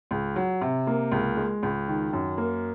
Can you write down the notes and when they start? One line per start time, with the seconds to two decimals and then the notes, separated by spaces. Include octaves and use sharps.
0.11 C#2
0.36 F#3
0.61 C3
0.87 A#3
1.12 C#2
1.37 G#3
1.63 C#2
1.88 D#3
2.13 F#2
2.38 A#3